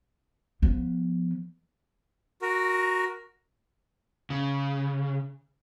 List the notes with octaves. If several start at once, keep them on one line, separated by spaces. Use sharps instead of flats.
F3 B3
F#4 A#4
C#3